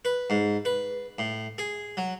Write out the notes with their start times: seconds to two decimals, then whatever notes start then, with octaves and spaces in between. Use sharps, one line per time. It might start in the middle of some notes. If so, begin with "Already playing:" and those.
0.05 B4
0.30 G#2
0.65 B4
1.19 A2
1.58 G#4
1.97 F#3